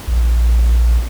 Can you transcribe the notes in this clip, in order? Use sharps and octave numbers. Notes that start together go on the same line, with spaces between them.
A#1